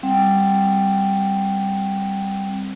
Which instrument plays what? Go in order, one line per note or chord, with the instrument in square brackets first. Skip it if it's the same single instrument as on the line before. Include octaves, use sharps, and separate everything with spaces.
[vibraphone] G3 C4 F#5 G5